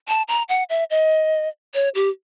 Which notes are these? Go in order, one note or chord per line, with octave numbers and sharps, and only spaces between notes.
A5
A#5
F#5
E5
D#5
C#5
G4